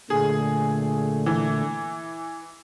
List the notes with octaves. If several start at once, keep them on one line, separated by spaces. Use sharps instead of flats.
A#2 D3 A3 G#4
E3